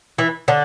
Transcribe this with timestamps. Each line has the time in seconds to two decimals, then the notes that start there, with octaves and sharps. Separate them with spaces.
0.18 E3 E4
0.48 D3 D4